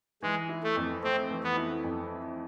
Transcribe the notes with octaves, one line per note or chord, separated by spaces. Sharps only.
E3 G#3
E4
A3
F2
A3 C4
E3
B3
E4
F2